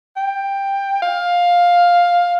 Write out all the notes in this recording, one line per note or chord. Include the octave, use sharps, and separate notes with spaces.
G5
F5